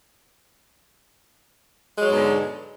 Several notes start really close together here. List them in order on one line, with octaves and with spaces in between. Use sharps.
G#3 F#3 G#2 B2 D3